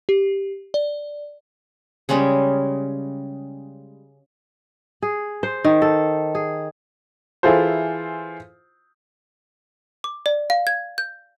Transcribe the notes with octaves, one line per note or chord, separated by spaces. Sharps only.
G4
D5
C#3 G3 G#3 C#4
G#4
C5
D#3
A4
G#4
E3 E4 F4 G#4 A4 C5
D6
D5
F5
G#6
G6